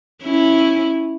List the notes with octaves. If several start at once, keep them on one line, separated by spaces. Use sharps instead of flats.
C#4 E4